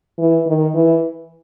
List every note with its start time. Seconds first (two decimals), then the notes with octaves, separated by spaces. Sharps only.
0.18 E3
0.47 D#3
0.75 E3